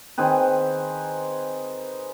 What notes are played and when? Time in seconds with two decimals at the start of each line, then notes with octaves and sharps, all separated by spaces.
0.18 D#3 C4 G#4 B4